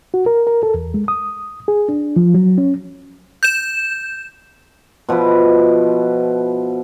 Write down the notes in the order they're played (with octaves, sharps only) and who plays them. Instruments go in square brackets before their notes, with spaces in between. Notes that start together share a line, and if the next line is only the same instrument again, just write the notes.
[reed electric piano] F#4
A#4
A#4
A4
E2
G#3
D#6
G#4
D4
F3
F#3
C#4
[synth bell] G6 E7
[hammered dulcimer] B2 F3 E4 B4